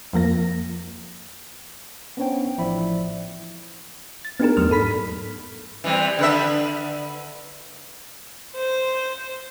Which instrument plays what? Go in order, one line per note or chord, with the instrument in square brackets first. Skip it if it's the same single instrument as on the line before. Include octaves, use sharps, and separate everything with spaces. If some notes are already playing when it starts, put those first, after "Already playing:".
[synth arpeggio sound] F2 F3 A#3 A#6
[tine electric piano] B3 C#4 D4 C5 C#5 G5
A1 F3 E4 C5 D5 B5
[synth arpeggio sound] A6
B3 D4 D#4 G4 G#4 A#4
E2 F#3 A3 F6
G#2 A4 B5 B6
[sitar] E3 G3 C4
D3 B4 E5
[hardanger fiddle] C5